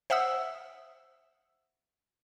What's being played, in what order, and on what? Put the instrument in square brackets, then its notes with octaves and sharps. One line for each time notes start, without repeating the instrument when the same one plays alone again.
[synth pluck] C5 E5 F#5 D#6 E6